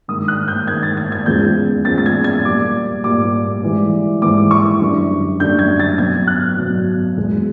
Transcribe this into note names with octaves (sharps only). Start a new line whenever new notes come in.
G2 D#3 G#3 D#6
F#6
G6
G2 D#3 G#3 G#6
A6
G#6
G#6
E2 C#3 F3 G#3 G6
E2 C#3 F3 G#3 A6
A6
G#6
G#6
A#2 G3 D6
A#2 G3 D6
G#2 E3 G3
G#2 E3 G3 D6
C#6
F#2 D3 G3
F#2 D3 G3 G6
G#6
A6
B2 F#3 G#6
F#6
B2 F#3
E2 B2 G#3